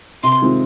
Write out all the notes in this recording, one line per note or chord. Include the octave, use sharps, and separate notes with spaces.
C3 C6
D#3 G#3 C4 F4